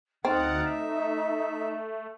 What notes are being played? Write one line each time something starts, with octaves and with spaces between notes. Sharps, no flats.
D2 C4 D#4 A4 F5 F#5 D6
A3 E5